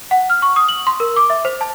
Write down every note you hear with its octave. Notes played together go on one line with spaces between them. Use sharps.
F#5
F6
C#6
D#6
F#7
C6
A#4
D6
E5
C5
A5